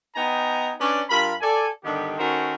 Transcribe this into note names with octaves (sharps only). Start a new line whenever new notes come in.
B3 D#4 G5 G#5 A#5
C#4 D4 B4 C#5 D5
G2 F4 A#4 B5
A4 D5 G#5
G2 D3 D#3 B3 G4
D#3 C#4 F#4 A4 A#4 C5